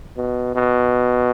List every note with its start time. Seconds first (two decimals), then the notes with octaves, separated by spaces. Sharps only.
0.17 B2
0.55 B2